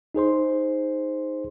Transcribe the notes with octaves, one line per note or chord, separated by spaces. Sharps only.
D#4 G#4 C5 C6